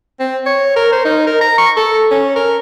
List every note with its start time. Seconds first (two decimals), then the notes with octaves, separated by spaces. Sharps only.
0.20 C4
0.46 C#5
0.76 A#4
0.92 C5
1.05 D#4
1.27 A#4
1.41 A#5
1.58 C#6
1.77 A4
2.11 C#4
2.36 A#4